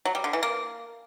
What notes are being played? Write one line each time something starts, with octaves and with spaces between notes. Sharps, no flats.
F#3
G3
D3
E3
A#3